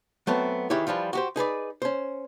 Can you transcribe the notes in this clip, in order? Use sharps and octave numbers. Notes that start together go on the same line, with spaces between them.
F#3 A3 B3 C4
D#3 E3 E4 G4 G#4 C#5
E3 F3 G3 F4
F#4 G4 C5
D#4 G#4 B4 D5
C#4 C5